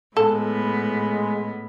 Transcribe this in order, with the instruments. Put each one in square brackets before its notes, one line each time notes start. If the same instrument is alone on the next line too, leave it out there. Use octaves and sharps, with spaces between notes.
[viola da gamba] A2 B3 [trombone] G#3 [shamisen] A4